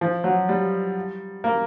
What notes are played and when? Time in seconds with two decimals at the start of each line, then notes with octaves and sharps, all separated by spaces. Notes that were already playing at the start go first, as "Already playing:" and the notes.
0.01 F3
0.24 F#3
0.49 G3
1.44 A#3